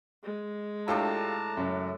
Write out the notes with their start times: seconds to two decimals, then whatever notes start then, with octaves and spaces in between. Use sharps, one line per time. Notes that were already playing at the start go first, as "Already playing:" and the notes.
0.23 G#3
0.88 A2 D4 F4 G4 A4 A5 A#5
1.57 F#2 C#3 F#3